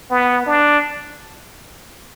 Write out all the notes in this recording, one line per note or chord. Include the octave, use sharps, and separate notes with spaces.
B3
D4